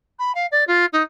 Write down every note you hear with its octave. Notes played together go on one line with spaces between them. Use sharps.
B5
F5
D5
F4
D#4